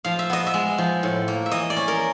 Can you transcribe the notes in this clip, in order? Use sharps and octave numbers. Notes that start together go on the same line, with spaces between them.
F3 F5
E5
B3 D#5
E5
G#3
F3
A2
A#3
E5
E3 D#5
D5
C#4
A#4